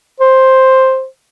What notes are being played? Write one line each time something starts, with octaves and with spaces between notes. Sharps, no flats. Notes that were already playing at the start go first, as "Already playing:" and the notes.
C5